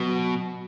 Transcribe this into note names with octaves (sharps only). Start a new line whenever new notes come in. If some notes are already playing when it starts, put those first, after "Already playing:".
Already playing: B2 F#3